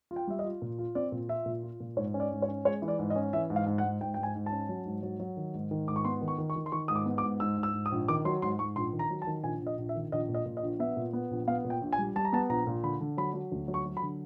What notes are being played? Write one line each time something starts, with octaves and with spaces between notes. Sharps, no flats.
F4
G5
G3 E5
D#5
F4
A#2
F4
C4 D5
A#2
F4 E5
A#2
F4
A#2
G#2 C#5
C#4
D5
G#2
C#5
C#4
G#3 C#5
E3
D5
G#2
D#5
C#4
E3 E5
G#2
F5
G#2
F#5
G#2
G#2 G5
G#2 G5
G#5
G#2
A5
C#4
F#3
G#2
F#3
F#3
D#3
G#2
D#3
G#2 D6
C#6
B3 C6
D#3
C#6
D#3
C#6
D#3
C6
D#3 C#6
G#2 D#6
D6
B3
D6
G#2
G#2 E6
G#2
E6
G#2
D#6
A#1
D#3 D6
F#3 C6
G#2 C6
G#2 C#6
A#1 C6
D#3
A#5
F#3
A5
D#3
A#1 G#5
A#1
D#5
A#1
E5
D#3
A#1 D#5
A#2
D#5
A#2
D#5
A#1
B3 E5
A#2
B3
A#1
B3 F5
A#2
G5
A#1
G#5
G3
G3 A5
A#5
B3 A5
A#1 A#5
A#2
D3 B5
D3
F#3 B5
F#3
D2
F#3
C#6
F#3
B5
D3